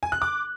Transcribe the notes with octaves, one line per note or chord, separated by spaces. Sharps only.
G#5
F#6
D6